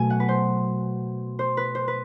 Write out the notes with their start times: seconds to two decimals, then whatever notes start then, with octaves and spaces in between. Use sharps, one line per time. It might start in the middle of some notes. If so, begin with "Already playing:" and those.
Already playing: B2 F#3 A3 G#5
0.10 F#5
0.20 B4
0.29 C5
1.39 C5
1.57 B4
1.75 C5
1.88 B4